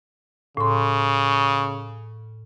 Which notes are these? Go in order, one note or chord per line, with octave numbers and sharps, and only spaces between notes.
A2 C#3 C6